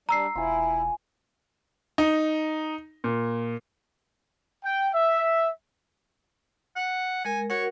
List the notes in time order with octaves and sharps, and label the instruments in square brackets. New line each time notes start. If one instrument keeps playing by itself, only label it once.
[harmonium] G3 D4 [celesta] A#5 E6 C7
[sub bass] E1 [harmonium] E4 [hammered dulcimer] F4 G#5
[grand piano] D#4
A#2
[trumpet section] G5
E5
[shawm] F#5
[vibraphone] G#3 A#4 [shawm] G#5
[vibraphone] F#4 A#4 F#5 [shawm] C#5